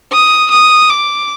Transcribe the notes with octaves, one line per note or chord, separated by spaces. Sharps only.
D#6
D#6
D6